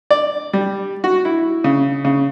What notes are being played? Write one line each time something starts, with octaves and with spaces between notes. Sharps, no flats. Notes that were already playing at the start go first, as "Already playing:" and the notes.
D5
G3
F#4
E4
C#3
C#3